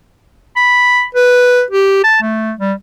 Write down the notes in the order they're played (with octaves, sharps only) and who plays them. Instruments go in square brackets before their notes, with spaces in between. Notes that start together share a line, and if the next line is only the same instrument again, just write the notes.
[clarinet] B5
B4
G4
A5
A3
G3